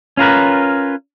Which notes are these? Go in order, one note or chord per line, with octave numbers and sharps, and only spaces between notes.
C#4 F4 A#4 B4